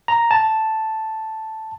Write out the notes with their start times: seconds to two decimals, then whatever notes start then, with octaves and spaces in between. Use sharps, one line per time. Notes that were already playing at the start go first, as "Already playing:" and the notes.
0.08 A#5
0.31 A5